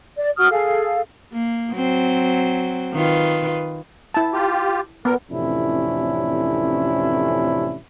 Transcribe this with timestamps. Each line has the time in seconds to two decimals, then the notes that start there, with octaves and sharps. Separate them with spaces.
0.16 D5
0.37 F#4 D#6 F6
0.51 G#4 A4 F5
1.32 A#3
1.73 F#3 C4
2.93 D#3 F4 B4
4.14 E4 A5
4.33 F4 G4
5.05 A#2 B3 A#4
5.31 A1 F2 C3 C#4 D4 E4